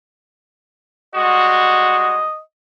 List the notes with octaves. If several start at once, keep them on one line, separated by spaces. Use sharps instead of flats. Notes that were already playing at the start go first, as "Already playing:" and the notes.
G3 G#3 F#4 D#5